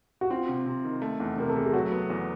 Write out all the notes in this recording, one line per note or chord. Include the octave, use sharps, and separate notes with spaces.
F#4
C4 F4
C3
C3
D#3
A3
E2
C3 A#4
A4
A3 G#4
G4
F#3 F#4
B3
E2